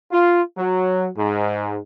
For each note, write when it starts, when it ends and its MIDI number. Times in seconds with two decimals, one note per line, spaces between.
0.11 0.41 65
0.58 1.09 54
1.18 1.79 44